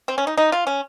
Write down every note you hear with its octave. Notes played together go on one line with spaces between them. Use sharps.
C4
C#4
D#4
D#4
F4
C#4